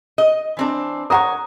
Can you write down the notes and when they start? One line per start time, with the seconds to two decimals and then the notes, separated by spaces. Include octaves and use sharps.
0.18 D#5
0.57 E3 C4 D4
1.10 A#4 C5 C#5 F#5 A#5 D#6